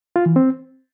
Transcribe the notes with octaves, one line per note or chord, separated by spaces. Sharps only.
F4
E3
C4